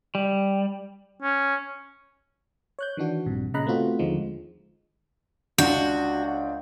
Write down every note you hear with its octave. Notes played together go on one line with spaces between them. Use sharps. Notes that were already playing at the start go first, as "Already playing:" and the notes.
G3
C#4
C#5 F#6 G6
D#3 E3 D4 F#4
A#1 G2 C3
A#2 C#3 D#5 A#5 B5 F#6
A3 B3 C4 F4 F#4
D#2 D3 F3 G#3 D#4
C#2 D4 F#4 G6